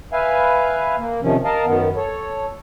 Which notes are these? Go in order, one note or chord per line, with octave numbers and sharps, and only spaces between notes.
B4 E5 F5 G#5
A#3
C3 D#3 F3 C#4
A#4 D#5 F5 A5
F#2 D#3 B3
A4 C#5